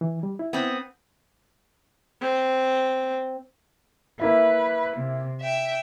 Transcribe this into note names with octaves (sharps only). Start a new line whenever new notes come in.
E3
G3
E4
B3 C4
C4
A#3 E4 B4 E5
C3
E5 G5